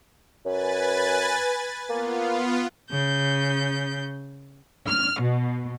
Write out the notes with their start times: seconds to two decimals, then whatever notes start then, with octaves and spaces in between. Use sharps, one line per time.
0.45 F#2 B4 G#5 A6
1.89 A#3 B3 F4
2.89 C#3 G6
4.88 F6
5.21 B2